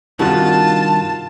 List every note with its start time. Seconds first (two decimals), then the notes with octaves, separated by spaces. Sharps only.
0.19 G2 C3 D#3 G3 F4 F#4 A5 F#6